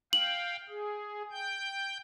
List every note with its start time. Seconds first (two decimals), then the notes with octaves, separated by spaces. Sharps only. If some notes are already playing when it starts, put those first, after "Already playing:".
0.13 F5 G5 F#7
0.69 G#4
1.31 G5 G6